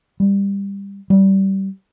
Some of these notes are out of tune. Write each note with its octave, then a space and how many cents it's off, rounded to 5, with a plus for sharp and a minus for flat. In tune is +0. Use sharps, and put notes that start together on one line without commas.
G3 +20
G3 -20